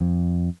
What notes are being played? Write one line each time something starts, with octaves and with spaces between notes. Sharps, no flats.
F2